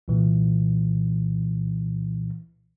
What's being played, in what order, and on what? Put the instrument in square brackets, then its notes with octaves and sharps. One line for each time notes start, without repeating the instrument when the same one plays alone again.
[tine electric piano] C2 A#2 E3